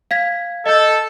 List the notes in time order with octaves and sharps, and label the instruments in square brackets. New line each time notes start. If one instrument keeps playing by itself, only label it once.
[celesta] F5 G#6 B6
[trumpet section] A4 [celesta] D#5 G6